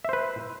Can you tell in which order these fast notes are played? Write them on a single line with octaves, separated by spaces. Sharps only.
E5 C5 B4